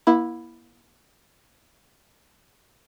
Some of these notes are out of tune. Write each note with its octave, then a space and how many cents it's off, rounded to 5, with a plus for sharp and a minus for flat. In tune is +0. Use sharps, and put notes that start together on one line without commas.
A#3 +45 E4 +0